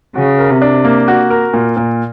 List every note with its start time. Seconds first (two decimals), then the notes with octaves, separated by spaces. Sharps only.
0.15 C#3 F#4
0.38 A#4
0.50 C3
0.62 D4
0.85 A#3
1.08 F#4
1.30 A#4
1.53 A#2
1.77 A#2